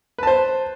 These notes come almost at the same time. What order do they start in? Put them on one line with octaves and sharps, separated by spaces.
B4 A5 C5